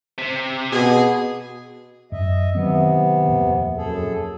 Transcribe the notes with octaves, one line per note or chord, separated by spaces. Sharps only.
C3
B2 G#4
F#2 D#5 E5
C3 D#3 F#3 B3 C4
D#1 F2 A#2
F#2 G#4 A4